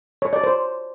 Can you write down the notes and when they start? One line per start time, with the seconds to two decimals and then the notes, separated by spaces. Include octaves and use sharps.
0.22 C#5
0.33 D5
0.44 C5